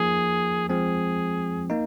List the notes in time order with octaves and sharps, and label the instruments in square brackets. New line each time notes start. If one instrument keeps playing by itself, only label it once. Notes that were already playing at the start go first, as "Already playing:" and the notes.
Already playing: [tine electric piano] F3 A#3 D#4 [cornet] G#4
[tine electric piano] F3 G#3 C4 [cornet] G#4
[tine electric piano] A#3 D#4